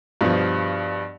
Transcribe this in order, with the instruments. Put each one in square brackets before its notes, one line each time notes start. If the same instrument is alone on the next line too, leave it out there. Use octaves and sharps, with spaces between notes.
[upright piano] G2 B2 F3